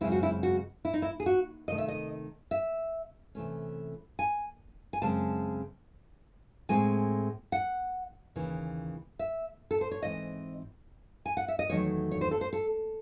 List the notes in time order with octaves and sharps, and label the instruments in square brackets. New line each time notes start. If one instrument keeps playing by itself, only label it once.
[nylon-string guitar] F#2 C#3 G#3 C4 E4
F#4
E4
F#4
E4
D#4
E4
G#4
F#4
C3 D#3 A3 D#5
E5
D#5
E5
C3 E3 A3 C#4
G#5
G#5
F#2 C#3 G#3 C4 A5
A2 G#3 C4 G#5
F#5
D#2 C#3 E3
E5
A4
C5
C#5
G#2 E3 C4 D#5
G#5
F#5
E5
D#5
E2 D#3 F#3 A3 C#5
C#5
C5
A4
C5
A4